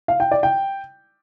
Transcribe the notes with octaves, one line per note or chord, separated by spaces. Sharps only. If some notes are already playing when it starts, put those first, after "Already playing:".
F5
G5
D5
G5